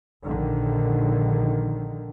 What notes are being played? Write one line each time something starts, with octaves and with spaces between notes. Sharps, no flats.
A#1 D3 D#3